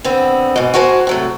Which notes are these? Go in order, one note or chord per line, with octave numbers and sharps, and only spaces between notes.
D3 B3 C4
G#2 B2
F#4 G#4 A#4 C5 A5
C3 F#3 A3